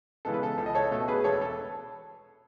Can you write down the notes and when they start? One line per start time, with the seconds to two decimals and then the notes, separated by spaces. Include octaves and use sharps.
0.25 C#3 E3 G#3 B3 A4
0.34 B4
0.43 A4
0.58 C#2 A4
0.66 D#5
0.75 A4 C#5
0.91 B2 A3 A4
1.08 G#4 B4
1.24 E1 A4 C#5
1.41 A4